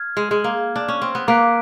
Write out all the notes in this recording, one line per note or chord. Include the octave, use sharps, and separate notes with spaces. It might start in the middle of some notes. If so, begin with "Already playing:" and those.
Already playing: F6 G#6
G#3
G#3
A#3
D4
C#4
C4
B3
A#3 A#5 D6 F#6 B6 D7